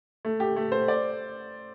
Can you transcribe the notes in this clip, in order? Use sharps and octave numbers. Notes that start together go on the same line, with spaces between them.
A3
G4
A3
C5
D5